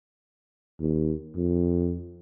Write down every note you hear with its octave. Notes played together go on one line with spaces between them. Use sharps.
D#2
F2